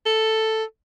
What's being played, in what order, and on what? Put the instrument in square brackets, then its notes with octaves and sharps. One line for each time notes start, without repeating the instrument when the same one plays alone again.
[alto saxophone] A4